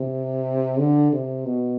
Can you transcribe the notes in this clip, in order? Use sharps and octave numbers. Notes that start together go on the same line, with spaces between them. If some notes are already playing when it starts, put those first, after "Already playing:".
Already playing: C3
D3
C3
B2